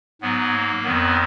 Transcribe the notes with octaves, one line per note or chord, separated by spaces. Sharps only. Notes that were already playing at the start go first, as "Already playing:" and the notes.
G#2 F#3 B3
A#3
F2 D#3 F#3 B3